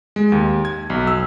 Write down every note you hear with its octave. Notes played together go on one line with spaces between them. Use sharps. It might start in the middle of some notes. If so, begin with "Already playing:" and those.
G#3
D#2
G#6
B1
E6